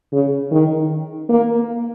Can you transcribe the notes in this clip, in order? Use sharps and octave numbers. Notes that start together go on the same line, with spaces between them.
C#3
D#3
A#3